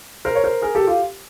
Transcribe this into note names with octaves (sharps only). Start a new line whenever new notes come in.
A#4 C5
C#5
A#4 C5
G#4 A#4
G4 A4
F4 G4